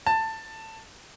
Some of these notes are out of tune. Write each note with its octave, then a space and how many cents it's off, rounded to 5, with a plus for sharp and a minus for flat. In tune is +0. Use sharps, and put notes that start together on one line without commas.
A5 +15